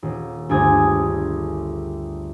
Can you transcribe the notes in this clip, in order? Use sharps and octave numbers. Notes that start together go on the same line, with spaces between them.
D#1
G1 D2 G#4 G#5 D#6 G#6